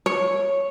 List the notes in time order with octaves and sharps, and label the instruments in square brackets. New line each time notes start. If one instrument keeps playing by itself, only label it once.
[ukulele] C#5